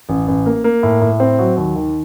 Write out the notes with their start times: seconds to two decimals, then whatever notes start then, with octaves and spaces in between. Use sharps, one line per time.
0.09 A1
0.28 A1
0.46 A#3
0.64 A#3
0.83 A2
1.02 A2
1.20 C4
1.39 F#3
1.57 D#2
1.76 D#3